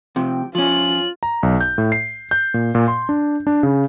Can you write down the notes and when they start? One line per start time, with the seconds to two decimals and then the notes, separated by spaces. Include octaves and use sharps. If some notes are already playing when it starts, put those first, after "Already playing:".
0.16 C3 F3 G5
0.55 F3 C#4 F4 F#7
1.23 A#5
1.43 B1
1.61 G6
1.78 A2
1.92 C7
2.31 G6
2.54 A#2
2.75 A#2
2.88 C6
3.09 D4
3.47 D4
3.63 C#3